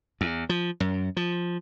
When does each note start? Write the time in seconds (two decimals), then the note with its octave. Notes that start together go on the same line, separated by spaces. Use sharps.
0.21 E2
0.49 F3
0.80 F#2
1.17 F3